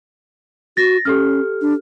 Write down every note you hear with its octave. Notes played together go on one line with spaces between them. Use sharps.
F#4 A6 A#6
C#4 G4 A4 F6
D4